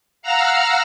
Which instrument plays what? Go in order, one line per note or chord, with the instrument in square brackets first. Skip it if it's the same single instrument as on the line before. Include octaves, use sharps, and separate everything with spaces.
[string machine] F5 F#5 A#5 E6 F6